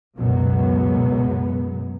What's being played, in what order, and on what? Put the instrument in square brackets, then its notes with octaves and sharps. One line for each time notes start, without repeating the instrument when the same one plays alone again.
[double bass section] C#2 F#2 B2 F#3 G#3 B3